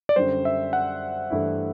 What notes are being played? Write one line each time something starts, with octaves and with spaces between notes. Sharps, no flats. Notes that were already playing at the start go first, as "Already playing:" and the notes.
D5
F#2 D3 G3 C5
E5
F#5
G2 E3 A3 E4